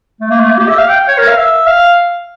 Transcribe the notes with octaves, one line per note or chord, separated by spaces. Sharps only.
A3
A#3
A3
A#3
G4
E5
F5
G5
C#5
A#4
F5
E5
F5